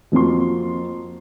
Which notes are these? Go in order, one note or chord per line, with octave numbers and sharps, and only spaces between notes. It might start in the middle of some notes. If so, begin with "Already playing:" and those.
F2 F3 A#3 F#4 C6